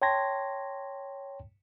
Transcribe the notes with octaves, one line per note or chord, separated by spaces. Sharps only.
C#5 G5 A5 C6 G#6 A#6